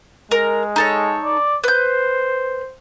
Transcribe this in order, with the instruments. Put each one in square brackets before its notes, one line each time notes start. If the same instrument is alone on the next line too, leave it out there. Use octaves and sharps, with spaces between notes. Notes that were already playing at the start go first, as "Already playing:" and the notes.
[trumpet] G#3 [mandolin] A#4
[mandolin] D#4 A4 C#5
[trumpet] D5
[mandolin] B4 G6 [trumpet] C5